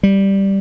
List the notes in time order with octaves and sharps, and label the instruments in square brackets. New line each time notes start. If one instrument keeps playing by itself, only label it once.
[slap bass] G3